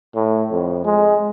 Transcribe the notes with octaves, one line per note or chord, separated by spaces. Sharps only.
A2
F2
G#3